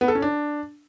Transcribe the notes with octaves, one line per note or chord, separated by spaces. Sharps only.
B3
A4
C#4
D4